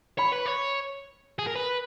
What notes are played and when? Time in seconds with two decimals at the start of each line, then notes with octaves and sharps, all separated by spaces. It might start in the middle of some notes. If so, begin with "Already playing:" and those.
0.18 C#5 B5
0.33 B4
0.46 C#5
1.39 G#4
1.47 A#4
1.56 B4